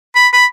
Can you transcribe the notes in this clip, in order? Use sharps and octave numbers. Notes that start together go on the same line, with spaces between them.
B5
B5